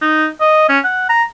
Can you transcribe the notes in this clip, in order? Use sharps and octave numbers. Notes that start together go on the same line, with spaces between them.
D#4
D#5
C#4
F#5
A#5